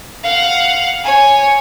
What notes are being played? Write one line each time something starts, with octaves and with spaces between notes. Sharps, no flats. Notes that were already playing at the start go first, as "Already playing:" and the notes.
F5 F#5
C#5 G#5